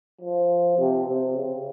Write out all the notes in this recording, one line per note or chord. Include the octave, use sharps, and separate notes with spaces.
F3
C3
C3
C#3